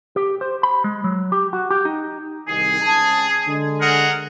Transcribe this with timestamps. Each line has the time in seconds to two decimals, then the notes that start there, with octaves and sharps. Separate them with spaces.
0.16 G4
0.41 C5
0.63 B5
0.84 G#3
1.04 F#3
1.32 G4
1.53 F#4
1.71 G4
1.85 D#4
2.48 C2 D#3 G#4
2.82 C#2 A5
3.47 D3 G#3
3.81 G#4 A#4 F#5